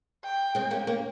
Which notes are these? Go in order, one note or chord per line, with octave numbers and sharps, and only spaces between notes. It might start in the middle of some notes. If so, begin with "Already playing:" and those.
G5
G#3 C4
A#3 C#4
A#3 C#4